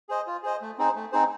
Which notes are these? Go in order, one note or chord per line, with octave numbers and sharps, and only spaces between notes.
G#4 C5 D#5
F4
G#4 C5 D#5
A3
C4 D#4 G#4 C5
A3
C4 D#4 G#4 C5